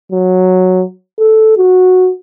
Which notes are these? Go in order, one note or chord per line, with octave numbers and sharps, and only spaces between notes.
F#3
A4
F#4